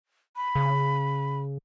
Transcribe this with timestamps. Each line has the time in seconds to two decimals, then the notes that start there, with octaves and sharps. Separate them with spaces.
0.36 B5
0.55 C#3